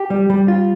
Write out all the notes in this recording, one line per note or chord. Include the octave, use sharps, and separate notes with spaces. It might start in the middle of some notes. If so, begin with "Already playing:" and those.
Already playing: G4
G3
G3
F4